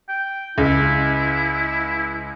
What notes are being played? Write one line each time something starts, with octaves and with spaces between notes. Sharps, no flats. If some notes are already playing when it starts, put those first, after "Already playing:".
G5
C#2 E4